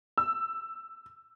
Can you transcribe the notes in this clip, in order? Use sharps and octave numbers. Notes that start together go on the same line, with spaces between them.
E6